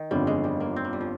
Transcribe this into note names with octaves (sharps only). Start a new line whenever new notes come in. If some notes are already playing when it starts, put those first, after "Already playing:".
Already playing: D#3
G1 F2 D3 G3
G#3
G3
A#3
C4
A#3
G3
F3